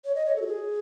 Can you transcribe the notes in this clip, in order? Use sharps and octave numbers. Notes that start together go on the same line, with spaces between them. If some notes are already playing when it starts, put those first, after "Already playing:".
C#5
D#5
C#5
A4
F#4
G#4